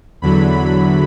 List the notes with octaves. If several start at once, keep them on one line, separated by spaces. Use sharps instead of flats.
E2 D3 F#3 B5
B5